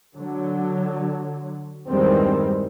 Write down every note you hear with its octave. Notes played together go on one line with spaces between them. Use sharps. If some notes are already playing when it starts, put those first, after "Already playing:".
D3 F#3
E2 G2 D#3 G3 G#3 C4